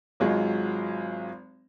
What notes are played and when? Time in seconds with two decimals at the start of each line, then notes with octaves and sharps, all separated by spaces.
0.20 G#1 F#3 G#3 F4